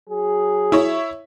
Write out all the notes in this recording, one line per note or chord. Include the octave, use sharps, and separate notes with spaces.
F#3 G#4
E4 C#5 E5